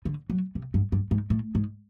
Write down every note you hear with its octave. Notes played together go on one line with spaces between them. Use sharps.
D3
F#3
C3
G2
G2
G#2
A2
G#2